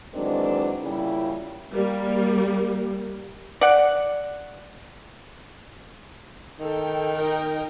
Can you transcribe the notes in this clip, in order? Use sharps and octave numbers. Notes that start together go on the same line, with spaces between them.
D#3 E3 F#3 G#3 C4 D4
A#2 C#3 G3 C#4 E4
G3 A#3
D5 F#5
D#3 A4 G5
D#4 A#4 G5